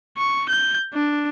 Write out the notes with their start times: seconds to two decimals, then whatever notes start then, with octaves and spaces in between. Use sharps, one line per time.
0.18 C#6
0.49 G6
0.94 D4